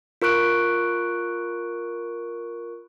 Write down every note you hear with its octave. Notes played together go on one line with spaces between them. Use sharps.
F4 A#4 C#6 F#6 D7